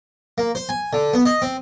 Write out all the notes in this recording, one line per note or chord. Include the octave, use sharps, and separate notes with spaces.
A#3
C5
G#5
D3
B3
D#5
C4